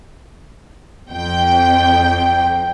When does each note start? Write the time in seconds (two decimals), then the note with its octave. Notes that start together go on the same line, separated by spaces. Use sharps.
1.09 F2 G5